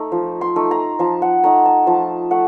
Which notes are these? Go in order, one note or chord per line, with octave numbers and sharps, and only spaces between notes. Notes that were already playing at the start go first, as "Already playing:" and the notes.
Already playing: A3 D#4 A#5
F3
C6
A3 D#4
A#5
F3 A5
F#5
A3 D#4 A#5
A5
F3 A5
A3 F#5